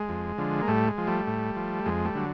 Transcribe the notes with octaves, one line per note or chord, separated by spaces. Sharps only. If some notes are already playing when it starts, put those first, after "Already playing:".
Already playing: G#3
F2
D3 F3
A#3
A2 G3 A3
G#3
F3
G3 A3
A2
F3
F2 G#3
G3 A3
D3 F#3